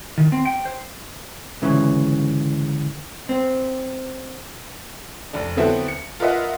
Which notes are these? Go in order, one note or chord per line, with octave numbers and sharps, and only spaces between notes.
D#3
C4
G5
C5
D2 G#2 C#3 E3
C4
F1 D4
D3 F#3 B3 C4 E4 A4
C#7
F4 A#4 B4 D#5 E5 F#5